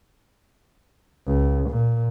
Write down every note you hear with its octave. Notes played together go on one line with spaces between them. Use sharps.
C#2
A#2